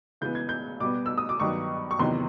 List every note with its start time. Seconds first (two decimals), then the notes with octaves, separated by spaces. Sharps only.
0.21 C#3 E3 G#3 B3 G6
0.35 G#6
0.49 G6
0.80 B2 G3 B3 D6
1.06 E6
1.18 D#6
1.29 D6
1.40 G2 D#3 F#3 B3 C#6
1.91 C#6
1.99 E2 C3 D#3 F#3 B3 C6